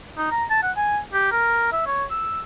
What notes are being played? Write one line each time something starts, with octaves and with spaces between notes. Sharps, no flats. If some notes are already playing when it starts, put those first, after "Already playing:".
D#4
A#5
A5
F#5
G#5
G4
A#4
E5
C#5
E6